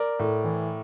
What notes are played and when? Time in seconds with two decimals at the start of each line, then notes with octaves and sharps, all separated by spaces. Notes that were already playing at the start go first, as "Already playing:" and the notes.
Already playing: A#4 D5
0.19 A2
0.44 E3